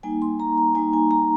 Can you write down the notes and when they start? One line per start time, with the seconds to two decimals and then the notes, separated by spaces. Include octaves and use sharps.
0.03 G3 A#3 D#4 G#5
0.22 C6
0.40 A#5
0.58 A#5
0.75 G3 A#3 D#4 G#5
0.93 G#5
1.11 A#5